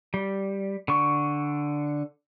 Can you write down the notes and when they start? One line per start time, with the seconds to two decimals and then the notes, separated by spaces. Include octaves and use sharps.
0.14 G3
0.88 D3 C#6